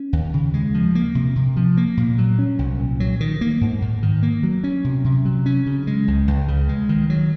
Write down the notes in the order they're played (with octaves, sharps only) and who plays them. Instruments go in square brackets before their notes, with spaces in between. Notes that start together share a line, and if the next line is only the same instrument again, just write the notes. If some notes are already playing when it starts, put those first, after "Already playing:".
Already playing: [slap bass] C#4
D#2
C#3
G#3
F3
A#3
C3
C3
F3
A#3
A#2
F#3
C#4
C2
A#2
F#3
D#3
A#3
G#2
G#2
D#3
A#3
F#3
C#4
C3
C3
F#3
C#4
C#3
G#3
C#2
C#2
C#3
G#3
D#3
F#3